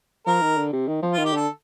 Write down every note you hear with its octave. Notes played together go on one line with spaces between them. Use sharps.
F3 A#4
D#3
D3
C3
D#3
F3
F4
D#3
G4
D3 A4